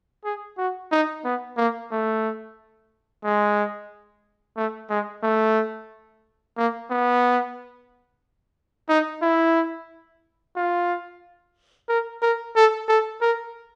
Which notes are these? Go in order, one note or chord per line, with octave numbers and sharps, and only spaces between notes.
G#4
F#4
D#4
B3
A#3
A3
G#3
A3
G#3
A3
A#3
B3
D#4
E4
F4
A#4
A#4
A4
A4
A#4